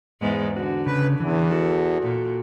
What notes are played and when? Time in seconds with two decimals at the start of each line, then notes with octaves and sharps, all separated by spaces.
0.21 E2 G#2 G#3
0.57 D3 F#4
0.86 C#3 B4
1.20 E2 E3
1.51 F#4 A4
2.02 A#2